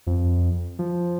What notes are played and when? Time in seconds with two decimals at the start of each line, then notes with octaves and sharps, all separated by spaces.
0.07 F2
0.79 F3